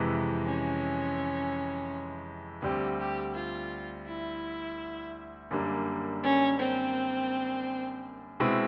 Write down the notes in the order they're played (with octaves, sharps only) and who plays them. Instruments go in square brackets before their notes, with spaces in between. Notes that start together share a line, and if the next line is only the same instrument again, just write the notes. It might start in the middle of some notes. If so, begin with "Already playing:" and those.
Already playing: [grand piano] F2 C3 E3 G#3
[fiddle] C#4
[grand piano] D2 D3 G3 C4 [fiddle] G4
[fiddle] G4
F4
E4
[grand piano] F#2 D3 G3 A#3
[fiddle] C#4
C4
[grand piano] B2 G#3 C4 E4